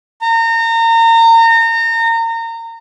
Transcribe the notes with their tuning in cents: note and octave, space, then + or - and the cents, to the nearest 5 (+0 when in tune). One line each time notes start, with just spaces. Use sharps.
A#5 -30